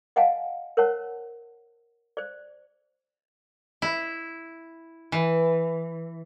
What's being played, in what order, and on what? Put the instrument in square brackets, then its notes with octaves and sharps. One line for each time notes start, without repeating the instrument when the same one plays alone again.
[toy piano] D#5 F5 F#5 G#5 A5
A#4 C5 C#5 F#5 A5
C5 D5
[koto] E4
E3